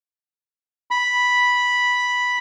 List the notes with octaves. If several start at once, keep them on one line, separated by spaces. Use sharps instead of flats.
B5